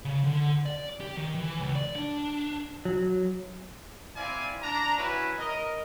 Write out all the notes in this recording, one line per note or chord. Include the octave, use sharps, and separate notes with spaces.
C#3
D3
D5
G4
D#3
E3
C#2
D5
D4
F#3
C4 E4 D5 F5 G#5
D4 A#5
C#4 E4 F#4 B4
A#4 D#5